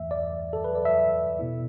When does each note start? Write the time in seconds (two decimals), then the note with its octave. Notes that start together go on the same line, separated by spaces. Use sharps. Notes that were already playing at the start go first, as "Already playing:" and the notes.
Already playing: E2 E3 A3 E5
0.11 D5
0.53 A4
0.64 B4
0.75 D5
0.85 E5
1.39 B2 B3 E4